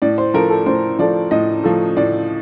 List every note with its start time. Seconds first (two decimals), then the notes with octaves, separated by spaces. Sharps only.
0.02 A2 D5
0.18 C5
0.34 F3 A3 A#4
0.50 A4
0.66 A2 C5
0.99 F3 A3 D5
1.31 A2 D#5
1.64 F3 A3
1.97 A2 D5